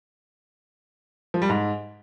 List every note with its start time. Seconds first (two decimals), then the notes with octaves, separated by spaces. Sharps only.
1.34 F3
1.42 G3
1.49 G#2